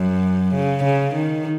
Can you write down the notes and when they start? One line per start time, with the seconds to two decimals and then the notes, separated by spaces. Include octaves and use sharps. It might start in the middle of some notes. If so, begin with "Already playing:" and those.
Already playing: F#2
0.54 C#3
0.84 C#3
1.15 D#3